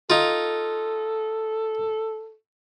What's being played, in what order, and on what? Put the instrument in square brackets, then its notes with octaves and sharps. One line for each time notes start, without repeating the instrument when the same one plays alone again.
[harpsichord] D#4 F4 [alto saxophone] A4